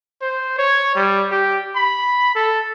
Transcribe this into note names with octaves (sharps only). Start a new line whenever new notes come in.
C5
C#5
G3
G4
B5
A4